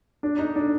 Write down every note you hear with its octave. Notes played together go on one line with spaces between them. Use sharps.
D4
D#4
D4